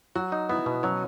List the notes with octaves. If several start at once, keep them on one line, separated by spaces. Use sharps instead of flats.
F#3 F#4
D#4
B3 E4
B2
F#3 C#4